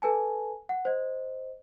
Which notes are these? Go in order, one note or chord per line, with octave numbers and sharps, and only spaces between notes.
A4 B4 G#5 A5
F#5
C5 D#5